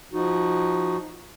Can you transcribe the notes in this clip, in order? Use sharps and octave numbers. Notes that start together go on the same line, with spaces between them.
F3 D#4 F#4